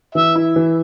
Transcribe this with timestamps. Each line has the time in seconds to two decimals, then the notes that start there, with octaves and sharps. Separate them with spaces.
0.15 E3 E5
0.35 E4
0.56 E3